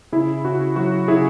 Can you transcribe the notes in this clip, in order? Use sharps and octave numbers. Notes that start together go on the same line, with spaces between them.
C#3 E4 G#4
C#3 F#4
F#3 F#4
C#3 E4 G#4